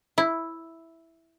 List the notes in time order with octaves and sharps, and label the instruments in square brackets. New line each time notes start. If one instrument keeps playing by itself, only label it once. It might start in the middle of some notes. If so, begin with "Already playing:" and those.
[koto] E4